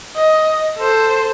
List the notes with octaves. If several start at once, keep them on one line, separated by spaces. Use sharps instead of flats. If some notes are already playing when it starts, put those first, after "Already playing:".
D#5
A4 C5